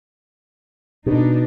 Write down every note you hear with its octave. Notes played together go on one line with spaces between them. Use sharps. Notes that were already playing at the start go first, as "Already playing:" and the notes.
B2 D4 D#4